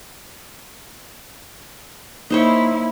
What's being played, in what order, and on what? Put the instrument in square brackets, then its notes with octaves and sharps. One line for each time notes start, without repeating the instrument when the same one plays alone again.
[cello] A#3 E4 [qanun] D#4 C5 C#5